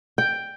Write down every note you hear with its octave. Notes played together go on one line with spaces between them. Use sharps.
G5